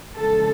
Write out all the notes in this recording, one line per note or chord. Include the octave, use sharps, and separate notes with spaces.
E2 C#3 F3 G#3 A4